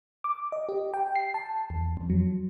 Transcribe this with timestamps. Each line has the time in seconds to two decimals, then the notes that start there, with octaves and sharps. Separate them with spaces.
0.24 D6
0.52 D#5
0.69 G4
0.94 G5
1.16 C7
1.34 A5
1.70 E2
1.97 F2
2.10 F#3